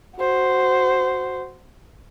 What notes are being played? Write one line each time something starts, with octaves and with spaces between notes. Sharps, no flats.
F#4 C5